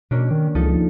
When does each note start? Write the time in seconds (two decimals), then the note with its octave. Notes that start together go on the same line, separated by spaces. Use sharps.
0.11 B2 A#3 C#4 D4
0.31 D#3
0.55 C#2 F3 D#4 A4